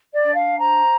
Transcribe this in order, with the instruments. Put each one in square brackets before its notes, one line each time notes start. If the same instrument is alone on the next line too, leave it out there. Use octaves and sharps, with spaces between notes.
[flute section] D5
D4
F5
C5 A#5